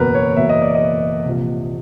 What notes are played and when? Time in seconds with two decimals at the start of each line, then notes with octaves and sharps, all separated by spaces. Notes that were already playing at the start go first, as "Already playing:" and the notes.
Already playing: F#1 E2 B2 A#4 B4
0.14 C#5
0.36 F#1 E2 B2 E5
0.49 D#5
0.62 D5
0.75 D#5
1.25 C2 A#2 F3